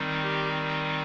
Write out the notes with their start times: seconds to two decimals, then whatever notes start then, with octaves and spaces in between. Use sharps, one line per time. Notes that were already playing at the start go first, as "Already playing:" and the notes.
Already playing: D#3 G3 C4 D#4
0.23 G4